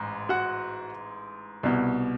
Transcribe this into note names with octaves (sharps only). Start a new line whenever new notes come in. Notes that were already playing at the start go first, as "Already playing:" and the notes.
Already playing: A1 G#2
F#4 F#5
C2 B2